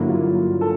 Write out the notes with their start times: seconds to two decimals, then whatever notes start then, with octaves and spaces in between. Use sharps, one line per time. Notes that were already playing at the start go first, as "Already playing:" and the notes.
Already playing: G2 D3 F#3 A#3 E4
0.09 F4
0.61 A4